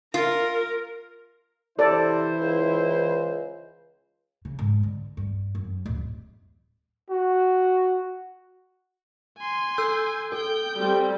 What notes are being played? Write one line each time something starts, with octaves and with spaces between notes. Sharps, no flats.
F4 A#4
C3 E3 E4 A4 C5 D5
C#2
C#3
G#2
D3
G2
F#2
D1
F#4
G#5 C6
A4 E6 G6
A4 G5 G6
G3 C4